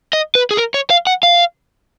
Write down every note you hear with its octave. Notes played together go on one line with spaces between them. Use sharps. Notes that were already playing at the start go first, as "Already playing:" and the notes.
D#5
B4
G#4
A#4
C#5
F5
F#5
F5